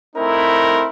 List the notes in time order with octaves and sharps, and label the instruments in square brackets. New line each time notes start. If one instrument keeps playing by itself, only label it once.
[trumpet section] A3 C4 D#4 E4 A#4